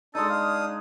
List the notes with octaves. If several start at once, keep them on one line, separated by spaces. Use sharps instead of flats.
G#3 D4 D#4 A4 D#6
F5